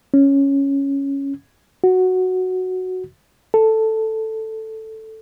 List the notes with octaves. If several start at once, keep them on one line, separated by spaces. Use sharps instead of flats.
C#4
F#4
A4